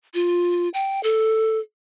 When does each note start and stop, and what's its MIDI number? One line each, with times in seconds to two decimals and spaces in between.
0.14 0.69 65
0.74 1.00 79
1.03 1.59 69